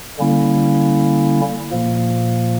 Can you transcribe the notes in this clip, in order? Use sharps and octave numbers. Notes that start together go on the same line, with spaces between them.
D3 G3 A#3 C#4 E4
A#2 F3 A#3